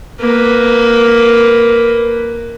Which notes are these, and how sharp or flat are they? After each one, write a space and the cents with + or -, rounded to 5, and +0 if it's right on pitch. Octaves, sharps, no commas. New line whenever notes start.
A#3 +0 B4 +0